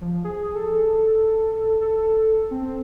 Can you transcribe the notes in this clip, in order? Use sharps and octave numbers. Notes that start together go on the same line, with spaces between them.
F3
G#4
A4
A4
C4